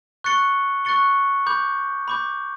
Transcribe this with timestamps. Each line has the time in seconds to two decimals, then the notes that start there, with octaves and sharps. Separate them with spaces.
0.24 C#6 F#6 A6 C#7 G7
0.85 C#6 F#6 A6 C#7 G7
1.46 B5 D6 G6
2.08 B5 D6 G6